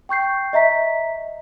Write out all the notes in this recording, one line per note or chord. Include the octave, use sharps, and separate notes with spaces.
G5 C#6 G6 C7
D#5 E5 A#5 B6